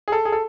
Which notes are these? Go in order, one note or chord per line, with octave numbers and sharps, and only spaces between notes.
G#4
A4
G#4
A4